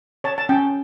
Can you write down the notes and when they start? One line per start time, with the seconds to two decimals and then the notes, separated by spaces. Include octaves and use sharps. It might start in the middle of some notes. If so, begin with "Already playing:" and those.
0.24 C#5 A5
0.38 A5
0.49 C#4 G5